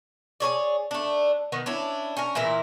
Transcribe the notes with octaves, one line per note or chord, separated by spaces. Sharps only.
G#4 A4 C#5 D5
A3 D4
D#3 B3 D#4
C#4 D4 E4
C#4 A#4
A#2 E3 E4 A#4